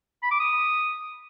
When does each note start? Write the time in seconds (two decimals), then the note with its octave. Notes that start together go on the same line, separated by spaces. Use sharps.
0.23 B5
0.31 D6
0.40 D#6